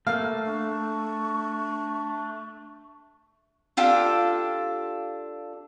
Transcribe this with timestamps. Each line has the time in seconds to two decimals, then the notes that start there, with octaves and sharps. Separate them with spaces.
0.07 A3 A#3 F5 F6
0.47 D4 C#6
3.77 D4 F4 G4 A4